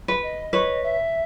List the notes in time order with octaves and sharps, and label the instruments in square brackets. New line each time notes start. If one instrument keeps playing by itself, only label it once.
[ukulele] B4
[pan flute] D#5
[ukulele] B4 C#5
[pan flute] E5